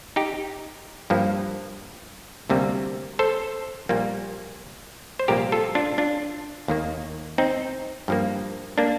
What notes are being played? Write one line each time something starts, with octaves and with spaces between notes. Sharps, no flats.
D#4 G4
G2 F3 A#3
D2 C3 G3 A#3
A4 C5
A#1 A#2 G3 A#3
C5
C2 A#2 F3 A#3 G4 A#4
F4 A4
D4 F4
D4 F4
D#2 D#3 A#3
C4 D#4
G2 F3 A#3
A#3 D4